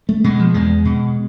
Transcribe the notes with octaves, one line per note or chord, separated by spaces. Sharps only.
A3
B2 G#3
F3
E2 G#3
B2